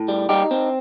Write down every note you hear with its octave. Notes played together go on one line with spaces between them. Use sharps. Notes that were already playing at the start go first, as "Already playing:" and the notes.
Already playing: A2
G3
G3 D#4 G4
C4